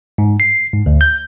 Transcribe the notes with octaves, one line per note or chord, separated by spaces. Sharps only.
G#2
C7
G#2
D2
G6